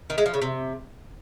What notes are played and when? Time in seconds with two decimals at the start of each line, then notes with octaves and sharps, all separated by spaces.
0.10 D#3
0.18 G#3
0.26 F3
0.34 C#3
0.42 C3